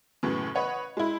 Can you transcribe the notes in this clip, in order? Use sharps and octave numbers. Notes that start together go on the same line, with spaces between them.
F#2 A2 C#3 E3
B4 C#5 D#5 F#5 B5
G#3 E4